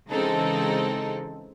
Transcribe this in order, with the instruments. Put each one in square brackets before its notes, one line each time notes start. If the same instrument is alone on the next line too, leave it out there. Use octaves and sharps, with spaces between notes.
[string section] C#3 E3 G#3 C4 D#4 A4